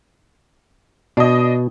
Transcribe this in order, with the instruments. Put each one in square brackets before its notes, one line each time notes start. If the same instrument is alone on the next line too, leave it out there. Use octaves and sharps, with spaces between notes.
[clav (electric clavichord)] B2 [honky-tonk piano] D4 D#5